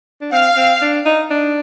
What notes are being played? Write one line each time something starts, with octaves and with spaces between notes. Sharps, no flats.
D4
C4 F5
C4
D4
D#4
D4